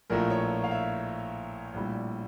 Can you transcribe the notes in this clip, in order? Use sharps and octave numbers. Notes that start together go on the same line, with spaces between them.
A#1 A2 F3 A3 A#4
C#5
F5
E5
A#1 A2 G3